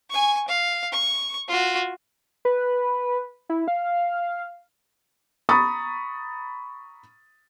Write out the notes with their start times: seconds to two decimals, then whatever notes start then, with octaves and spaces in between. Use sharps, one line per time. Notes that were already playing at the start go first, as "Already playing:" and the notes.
0.10 G#5 C#6
0.48 F5
0.93 C#6
1.48 F4 F#4
2.45 B4
3.49 E4
3.68 F5
5.49 A#5 B5 C#6 D#6 A6